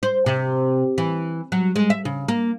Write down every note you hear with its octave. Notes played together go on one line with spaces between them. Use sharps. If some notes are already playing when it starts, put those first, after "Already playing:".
C5
C3
E3
F#3
G#3
E5
C#3
A#3